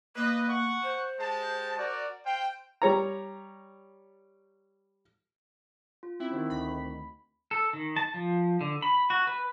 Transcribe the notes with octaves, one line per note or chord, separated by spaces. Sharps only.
A#3 B4 D#5
F#5 C#6
C5
G#3 G4 A5
F#4 A#4 D5
C5 F5 G5
G3 C#5 A#5
F4
C4 C#4 E4
D#3 C4 F#4 C5
D2 B5
A4
D#3
A5
F3
D3
B5
F#4
B4